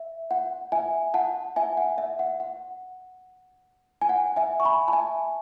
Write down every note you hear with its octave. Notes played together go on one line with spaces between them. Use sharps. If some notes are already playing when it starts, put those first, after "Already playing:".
Already playing: E5
F#5
E5 G#5
F#5 A5
E5 G#5
F#5
E5
F#5
F#5
G#5
F#5
E5 G#5
C#6
G#5 B5
A5
E5 G#5